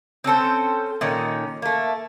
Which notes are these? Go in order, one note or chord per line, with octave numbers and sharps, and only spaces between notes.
C4 C#4 A4 C5
A#2 D#3 C#4
A3 A#3